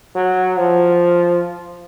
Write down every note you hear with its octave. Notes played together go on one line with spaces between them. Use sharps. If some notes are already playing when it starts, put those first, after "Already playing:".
F#3
F3